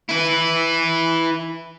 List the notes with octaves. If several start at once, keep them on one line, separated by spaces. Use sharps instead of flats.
E4 B4